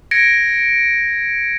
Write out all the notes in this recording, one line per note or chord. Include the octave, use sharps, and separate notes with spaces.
G#6 A#6 C#7 D7